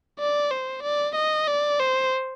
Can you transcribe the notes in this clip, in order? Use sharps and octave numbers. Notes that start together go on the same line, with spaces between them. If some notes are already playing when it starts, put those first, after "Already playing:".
D5
C5
D5
D#5
D5
C5